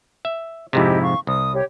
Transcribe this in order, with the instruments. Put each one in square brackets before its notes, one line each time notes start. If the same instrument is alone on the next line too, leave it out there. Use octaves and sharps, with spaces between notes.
[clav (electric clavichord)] E5
[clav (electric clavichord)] F2 G#2 C3 [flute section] E4 G4 D#5
[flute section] F5 C#6
[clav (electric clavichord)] C2 [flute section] D#6
[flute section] G4 C#5